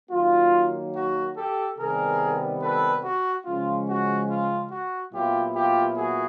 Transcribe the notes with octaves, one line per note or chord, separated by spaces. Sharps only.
D#3 F#3 A#3 F4
F#4
G4 A4
C3 D#3 G3 B3 G#4 A#4
A4 B4
F#4
C#3 F3 G#3 C#4 F4
F#4
F4
F#4
A#2 F#3 B3 E4 F4 G4
F4 G4
F#4 G#4